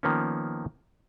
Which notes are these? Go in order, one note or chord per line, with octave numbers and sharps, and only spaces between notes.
D#3 F3 A#3 B3 C#4